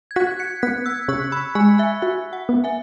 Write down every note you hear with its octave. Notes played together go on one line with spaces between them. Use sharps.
G#6
F#4 F#6 B6
G#6 C#7
B3 F#6 B6
E6 G#6
C#3 C#6 F#6
B5 E6
G#3 G#5 C#6
E5 G#5
F#4 E5
F#5
B3
E5 G#5